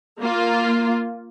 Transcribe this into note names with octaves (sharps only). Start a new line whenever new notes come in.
A#3 F4